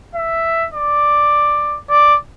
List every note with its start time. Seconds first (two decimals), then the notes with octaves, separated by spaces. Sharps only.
0.15 E5
0.74 D5
1.89 D5